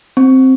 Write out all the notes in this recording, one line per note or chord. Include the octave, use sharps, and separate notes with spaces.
C4